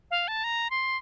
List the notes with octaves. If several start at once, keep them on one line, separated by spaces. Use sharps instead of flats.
F5
A5
A#5
C6